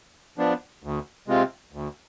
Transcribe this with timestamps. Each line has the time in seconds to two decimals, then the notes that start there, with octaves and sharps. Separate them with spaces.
0.38 F3 B3 D4
0.84 D2
1.28 C3 G#3 C4 F4
1.73 D2